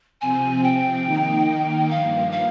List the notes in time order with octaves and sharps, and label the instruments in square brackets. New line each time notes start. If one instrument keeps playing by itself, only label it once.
[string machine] C3 F3 C4 [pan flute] G#5
[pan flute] G5
[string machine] D#3 A#3 D#4
[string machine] G2 F3 A#3 [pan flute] F5
[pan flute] F5